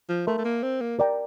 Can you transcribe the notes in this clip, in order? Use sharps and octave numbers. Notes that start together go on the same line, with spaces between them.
F3
A3 A#4 E5 A5 C6
A3
A#3
C4
A#3
A#4 D5 G5 A#5